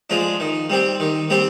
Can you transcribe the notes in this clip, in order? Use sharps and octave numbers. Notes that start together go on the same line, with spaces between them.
F3 G#3 D4
D#3
G3 C4 G4
D#3
G3 C4 G4